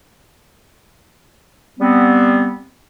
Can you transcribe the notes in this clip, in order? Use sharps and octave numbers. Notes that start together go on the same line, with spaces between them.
G3 B3 C4